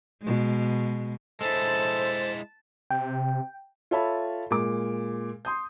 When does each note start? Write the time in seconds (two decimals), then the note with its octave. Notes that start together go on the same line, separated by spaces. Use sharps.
0.21 B2 G#3
1.41 G#3 E4 A4 C5 A5
2.91 C3 G5
3.91 F4 A4 C#5 E5 A5 B5
4.50 A#2 G#3 D6
5.45 C6 D#6 G6